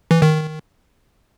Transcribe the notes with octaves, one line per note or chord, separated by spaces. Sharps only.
E3
D#3